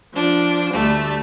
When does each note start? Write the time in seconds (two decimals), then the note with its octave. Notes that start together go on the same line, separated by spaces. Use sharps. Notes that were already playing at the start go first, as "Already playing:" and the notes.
0.14 F3 D4
0.73 D2 G3 A3 A5